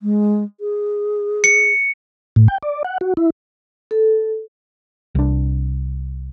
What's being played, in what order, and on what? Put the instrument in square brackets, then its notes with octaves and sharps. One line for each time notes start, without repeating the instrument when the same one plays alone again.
[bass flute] G#3
G#4
[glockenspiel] C#7
[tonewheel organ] A2
G5
D5
F#5
F#4
E4
[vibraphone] A4
[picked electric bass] C2 D4